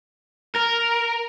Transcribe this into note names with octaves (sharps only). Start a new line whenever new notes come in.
A#4